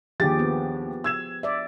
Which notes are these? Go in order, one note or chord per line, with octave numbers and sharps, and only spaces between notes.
D#2 F3 D4 G4 G#4 A6
B3
E6 G#6 E7
D5 E5